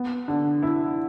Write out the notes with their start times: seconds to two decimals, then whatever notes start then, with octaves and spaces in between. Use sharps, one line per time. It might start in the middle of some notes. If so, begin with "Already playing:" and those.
Already playing: B3
0.28 D3
0.63 E4